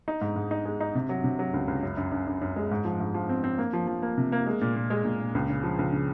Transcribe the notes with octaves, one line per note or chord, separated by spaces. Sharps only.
D#4
G#2
G#2
D#4
G#3
D#4
C3
F#3
C3
F#3
C#2
C#2
F#2
F#2
F#2
F#2
F#2
G#3
G#2
F3
G#2
F3
C4
C4
A#3
F3
F3
A#3
C3
A#3
G#3
A#2
A#2
G#3
A#2
A#2
C#2
C#3
F3
C#2
C#3